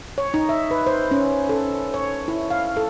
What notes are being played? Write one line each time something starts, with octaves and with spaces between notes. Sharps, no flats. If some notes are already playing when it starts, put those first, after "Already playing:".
C#5
D#4
E5
B4
C5
C#4
A4
C#5
E4
F5
A4